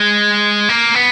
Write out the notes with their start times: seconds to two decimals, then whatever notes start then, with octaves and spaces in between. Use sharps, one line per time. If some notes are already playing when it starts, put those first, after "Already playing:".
Already playing: G#3
0.69 A#3
0.95 B3